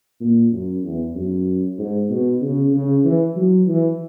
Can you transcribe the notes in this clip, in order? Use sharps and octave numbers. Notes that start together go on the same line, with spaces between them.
A#2
F#2
E2
F#2
G#2
B2
C#3
C#3
E3
F#3
E3